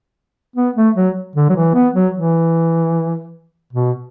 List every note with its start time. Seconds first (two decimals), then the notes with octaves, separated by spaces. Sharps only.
0.56 B3
0.76 A3
0.96 F#3
1.36 D3
1.49 F#3
1.56 E3
1.75 B3
1.95 F#3
2.15 E3
3.73 B2